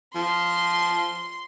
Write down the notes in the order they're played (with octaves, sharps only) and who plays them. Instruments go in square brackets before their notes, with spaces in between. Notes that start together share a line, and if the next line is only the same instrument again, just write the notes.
[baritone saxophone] F3 [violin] C6